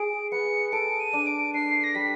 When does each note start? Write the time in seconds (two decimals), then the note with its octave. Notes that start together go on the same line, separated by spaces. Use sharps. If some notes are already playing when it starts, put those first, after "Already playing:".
Already playing: G#4 D7
0.31 B3 C#7
0.72 A4 D7
1.00 D#7
1.13 D4
1.27 D7
1.54 D4 C7
1.84 A#6
1.95 G3 B6